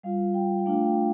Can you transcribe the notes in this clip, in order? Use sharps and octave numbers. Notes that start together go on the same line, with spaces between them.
G3 F4 F5
G5
G5
A3 D4 F4 F5
G5